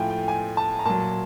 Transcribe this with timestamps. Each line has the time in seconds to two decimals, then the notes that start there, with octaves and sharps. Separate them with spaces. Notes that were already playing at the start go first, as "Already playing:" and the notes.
Already playing: A2 F3 G5 G#5
0.10 G5
0.28 G#5
0.57 A5
0.79 A#5
0.85 A#2 F#3 A5